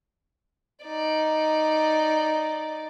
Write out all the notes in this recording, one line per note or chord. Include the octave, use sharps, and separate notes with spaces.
D#4 D5